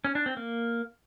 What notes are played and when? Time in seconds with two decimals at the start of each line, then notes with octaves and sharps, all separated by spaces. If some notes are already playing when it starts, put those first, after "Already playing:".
0.05 C#4
0.15 D4
0.26 C4
0.37 A#3